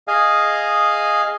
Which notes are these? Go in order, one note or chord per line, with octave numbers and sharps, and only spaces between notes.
G#4 D#5 F5 G#5